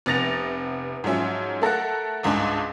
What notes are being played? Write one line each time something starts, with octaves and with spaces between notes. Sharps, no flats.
F1 C3 B3 A6 A#6 F7
G#2 F3 F#3 C#4 E5
A3 A4 A#4 F#5
G1 C#2 G#2 G#3 D4